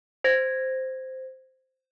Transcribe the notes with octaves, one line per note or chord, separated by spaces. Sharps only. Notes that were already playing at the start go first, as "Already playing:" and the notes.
C5 G#6 A#6